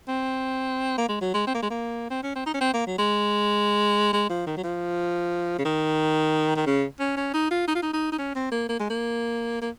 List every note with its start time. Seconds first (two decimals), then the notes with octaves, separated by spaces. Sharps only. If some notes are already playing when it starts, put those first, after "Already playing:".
0.08 C4
0.98 A#3
1.09 G#3
1.21 F#3
1.34 G#3
1.47 C4
1.55 A#3
1.63 G#3
1.71 A#3
2.10 C4
2.23 C#4
2.36 C4
2.46 D#4
2.54 C#4
2.61 C4
2.74 A#3
2.87 F#3
2.99 G#3
4.13 G#3
4.30 F3
4.47 D#3
4.57 F#3
4.64 F3
5.59 C#3
5.65 D#3
6.56 D#3
6.67 C#3
7.00 C#4
7.17 C#4
7.34 D#4
7.51 F4
7.68 D#4
7.75 F4
7.83 D#4
7.93 D#4
8.12 D#4
8.19 C#4
8.36 C4
8.52 A#3
8.69 A#3
8.80 G#3
8.90 A#3
9.62 A#3